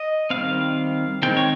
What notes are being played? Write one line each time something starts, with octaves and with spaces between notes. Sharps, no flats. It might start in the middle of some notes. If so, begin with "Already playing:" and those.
Already playing: D#5
D#3 G3 C4 F5
D#3 G#3 C4 G5
C#5